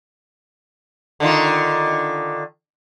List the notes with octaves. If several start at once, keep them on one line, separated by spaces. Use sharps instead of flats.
D3 D#3 F4